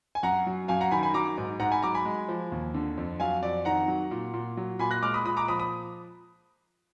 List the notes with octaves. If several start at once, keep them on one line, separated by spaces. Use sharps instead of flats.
G#5
F#2 F#5 A#5
F#3
F#2 F5 G#5
F#5 A#5
D#3 G#5 B5
G#5 B5
F#3 A#5 D6
G#2
G#2 F#5 A#5
G#5 B5
F#3 A#5 D6
G#5 B5
G#3
F3
D#2
D3
F2
F#3 F5 G#5
F2 D5
D#3 F#5 A#5
F#3
A#2
A#2
F#3
A#2 G#5 B5
F#6 A#6
G#3 D6 F6
B5 D#6
A#2 B5 D#6
A#5 D6
F3 B5 D#6
B5 D#6